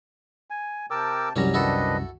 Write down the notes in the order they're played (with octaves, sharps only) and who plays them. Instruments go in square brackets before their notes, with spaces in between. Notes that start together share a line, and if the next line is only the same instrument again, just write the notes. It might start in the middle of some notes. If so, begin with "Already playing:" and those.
[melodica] G#5
[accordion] C3 G5 A5 [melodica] A#4 D6 E6
[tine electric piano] C2 F#2 A#6 [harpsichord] F#3 G3 C#4
[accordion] D#3 C4 D4 [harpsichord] E4 F#4 A4 [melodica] B4 D#5